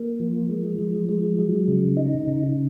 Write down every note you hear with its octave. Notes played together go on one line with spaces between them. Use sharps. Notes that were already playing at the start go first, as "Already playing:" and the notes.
Already playing: A#3
F3
G#3
F3
G#3
F#3
C#3
D#4
C#3